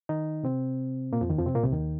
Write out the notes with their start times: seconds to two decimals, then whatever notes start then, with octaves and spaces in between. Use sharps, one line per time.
0.09 D#3 D#4
0.43 C3 C4
1.13 A#2 A#3
1.21 F2 F3
1.29 D#2 D#3
1.38 F2 F3
1.46 C3 C4
1.55 A#2 A#3
1.63 C2 C3
1.72 D#2 D#3